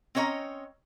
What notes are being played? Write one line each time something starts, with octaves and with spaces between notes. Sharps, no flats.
C4 C#4 C#5 D#5 A#5